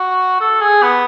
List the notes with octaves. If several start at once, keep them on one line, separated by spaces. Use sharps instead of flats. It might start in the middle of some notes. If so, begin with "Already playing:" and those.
Already playing: F#4
A4
G#4
B3